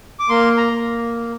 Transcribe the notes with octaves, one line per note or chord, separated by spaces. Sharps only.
D6
A#3 C6
A#5
A#3